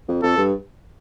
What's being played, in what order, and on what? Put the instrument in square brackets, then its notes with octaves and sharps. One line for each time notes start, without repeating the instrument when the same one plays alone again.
[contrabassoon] F2
[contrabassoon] F2 [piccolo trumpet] A4
[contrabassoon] G2